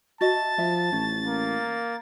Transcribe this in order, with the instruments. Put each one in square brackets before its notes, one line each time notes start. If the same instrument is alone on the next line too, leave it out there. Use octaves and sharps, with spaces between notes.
[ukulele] F#4 D#5 E5 [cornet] A5 [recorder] A6
[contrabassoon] F3 [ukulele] E5
[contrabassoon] A1 [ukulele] C#4
[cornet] A#3